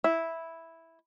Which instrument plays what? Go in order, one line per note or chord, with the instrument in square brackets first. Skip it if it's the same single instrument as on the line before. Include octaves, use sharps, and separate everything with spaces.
[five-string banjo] E4